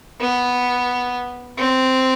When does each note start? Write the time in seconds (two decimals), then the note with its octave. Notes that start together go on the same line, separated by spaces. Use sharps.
0.21 B3
1.58 C4